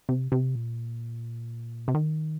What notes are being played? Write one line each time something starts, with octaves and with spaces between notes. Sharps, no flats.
C3
C3
A#2
C3
D#3